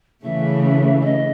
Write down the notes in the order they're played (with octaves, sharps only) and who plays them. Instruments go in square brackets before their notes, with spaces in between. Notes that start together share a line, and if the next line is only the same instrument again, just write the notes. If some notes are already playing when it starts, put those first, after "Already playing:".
[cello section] C#3 E3 A3 [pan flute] E5
[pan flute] E5
D#5